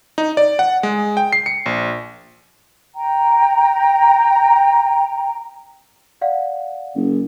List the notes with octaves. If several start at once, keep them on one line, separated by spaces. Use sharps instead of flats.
D#4
D5
F#5
G#3
G5
C7
C#7
A#1
G5 A#5
D5 F5 F#5
F#1